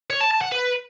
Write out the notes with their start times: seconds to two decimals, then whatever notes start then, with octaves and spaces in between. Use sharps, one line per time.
0.10 C#5
0.21 A5
0.31 A5
0.41 F#5
0.52 B4